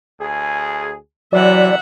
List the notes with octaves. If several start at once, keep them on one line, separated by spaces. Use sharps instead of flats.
D2 G#4
C3 E3 F#3 D5 E5 F#5